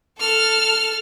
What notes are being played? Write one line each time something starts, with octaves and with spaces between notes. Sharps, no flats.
A4 F6